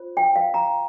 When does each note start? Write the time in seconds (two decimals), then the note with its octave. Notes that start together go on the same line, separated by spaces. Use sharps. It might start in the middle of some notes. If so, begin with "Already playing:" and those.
Already playing: F4 C5
0.17 G5
0.36 F5
0.54 A#5